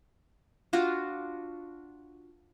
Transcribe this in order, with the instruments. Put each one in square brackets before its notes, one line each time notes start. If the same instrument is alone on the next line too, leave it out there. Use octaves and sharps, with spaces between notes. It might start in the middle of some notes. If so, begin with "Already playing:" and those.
[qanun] D4 F4 F#4